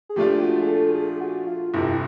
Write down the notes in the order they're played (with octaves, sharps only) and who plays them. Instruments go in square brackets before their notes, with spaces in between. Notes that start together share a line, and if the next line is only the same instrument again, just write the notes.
[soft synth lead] G#4
[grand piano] A#2 F3 A3 D4 F4 [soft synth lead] G4
[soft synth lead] G4
F#4
G#4
A4
G#4
F#4
F4
[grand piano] G1 F2 C3 [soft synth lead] E4